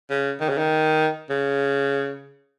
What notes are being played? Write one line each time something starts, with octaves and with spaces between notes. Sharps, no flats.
C#3
D#3
C#3
D#3
C#3